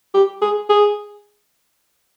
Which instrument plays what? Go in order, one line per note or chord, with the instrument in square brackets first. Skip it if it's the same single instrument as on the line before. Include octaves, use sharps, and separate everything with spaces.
[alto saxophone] G4
G#4
G#4